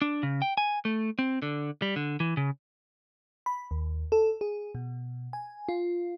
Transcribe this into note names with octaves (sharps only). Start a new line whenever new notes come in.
D4
C#3
G5
G#5
A3
C4
D3
G3
D3
E3
C#3
B5
D#2
A4
G#4
B2
G#5
F4